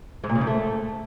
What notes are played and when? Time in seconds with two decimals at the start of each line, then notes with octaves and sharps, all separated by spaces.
0.24 G#2
0.29 A#2
0.35 C#3
0.41 G#2
0.47 A3